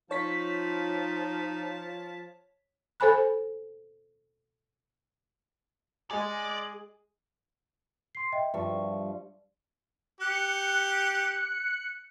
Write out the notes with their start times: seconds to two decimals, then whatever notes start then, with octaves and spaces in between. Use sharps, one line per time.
0.11 F3 D#4 F4 C#5 A5 B6
3.00 A4 C5 G#5 B5 F#6
6.11 G#3 G#4 D5
8.15 C6 C7
8.32 D#5 E5 G5
8.54 G2 F3 E5 C#6
10.21 G4 F#6 C#7